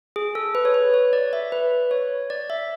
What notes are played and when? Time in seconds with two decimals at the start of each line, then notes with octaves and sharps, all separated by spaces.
0.16 G#4
0.35 A4
0.55 B4
0.65 C#5
0.74 B4
0.94 C#5
1.13 D5
1.33 E5
1.52 B4
1.91 C#5
2.30 D5
2.50 E5